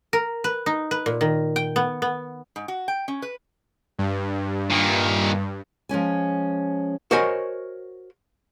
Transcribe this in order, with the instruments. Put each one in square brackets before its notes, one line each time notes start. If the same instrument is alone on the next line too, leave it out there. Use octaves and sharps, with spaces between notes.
[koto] A#4
B4
D#4
B4
A#2
D#3
G5
B3
B3
[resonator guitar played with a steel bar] G#2
F#4
G5
C#4
B4
[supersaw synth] G2
[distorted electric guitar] A#2 D#3
[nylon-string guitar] F3 G#3 C#4 G#5
[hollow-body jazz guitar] F#4 A#4 C5 C#5 D#5 G#5